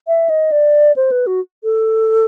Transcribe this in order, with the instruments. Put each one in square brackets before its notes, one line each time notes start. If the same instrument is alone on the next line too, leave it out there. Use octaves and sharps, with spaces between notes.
[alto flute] E5
D#5
D5
C5
B4
F#4
A4